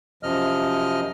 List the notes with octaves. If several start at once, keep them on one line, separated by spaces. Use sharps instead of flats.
F#2 C3 F3 D#5 F6